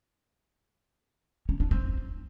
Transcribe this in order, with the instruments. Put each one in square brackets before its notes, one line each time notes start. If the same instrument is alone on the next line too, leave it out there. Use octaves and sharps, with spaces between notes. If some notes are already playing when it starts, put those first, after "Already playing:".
[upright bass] C#4
D4
C4